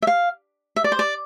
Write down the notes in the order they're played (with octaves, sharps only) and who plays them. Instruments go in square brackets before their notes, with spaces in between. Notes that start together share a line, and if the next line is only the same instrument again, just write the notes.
[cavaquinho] E5
F5
E5
D5
C5
D5